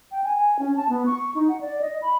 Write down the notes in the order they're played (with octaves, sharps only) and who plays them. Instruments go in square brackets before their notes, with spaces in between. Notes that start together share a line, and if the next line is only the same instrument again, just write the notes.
[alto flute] G5
G#5
G#5
C#4
A5
B3
C#6
D#4
F#5
D5
D#5
B5